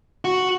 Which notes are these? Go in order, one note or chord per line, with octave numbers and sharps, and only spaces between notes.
F#4